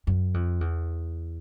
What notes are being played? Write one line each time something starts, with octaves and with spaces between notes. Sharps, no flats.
F#2
F2
E2